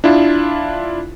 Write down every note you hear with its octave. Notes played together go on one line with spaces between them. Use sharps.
D4 E4 F4